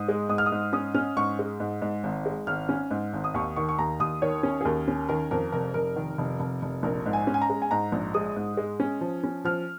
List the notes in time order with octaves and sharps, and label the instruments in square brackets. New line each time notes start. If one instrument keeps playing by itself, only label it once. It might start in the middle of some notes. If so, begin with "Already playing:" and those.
Already playing: [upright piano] G#2 D#6
G#3
G#2 D#6
F6
D#6
G#2
C#4 D#6
C#4 F6
G#2 C#6
G#3
G#2
G#2
G#1
G#3
G#1 F6
C#4
G#2
G#1
D#6
D#2 C#6
D#3 C#6
C#6
D#2 A#5
D#2 D#6
D#3 C#5
C#4
G#4
D#2 A#4
C#4
D#3 A#4
F2 A#4
F1 A#4
F1 A#4
D#3
F1
F1
F1
A#1 A#4
G#2
G#5
C#4
G#5
A#5
G#3
G#5
G#2 A#5
A#1
G#3 D#6
G#2
G#3
C#4
F3
C#4
F3 F6